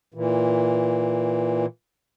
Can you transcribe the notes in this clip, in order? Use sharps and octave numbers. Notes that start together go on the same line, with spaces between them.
A#2 E3